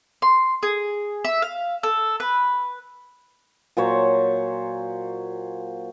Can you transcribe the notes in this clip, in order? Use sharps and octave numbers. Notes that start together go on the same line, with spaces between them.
C6
G#4
E5
F5
A4
B4
A#2 F#3 C5 C#5